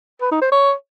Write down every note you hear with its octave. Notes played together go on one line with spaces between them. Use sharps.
B4
D#4
C5
C#5